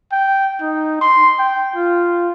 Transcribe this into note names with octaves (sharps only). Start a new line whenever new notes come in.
G5
D#4
C6
G5
F4